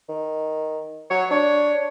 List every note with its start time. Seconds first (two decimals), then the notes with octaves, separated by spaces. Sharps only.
0.09 D#3
1.11 F#3 C#5
1.31 D4 C#5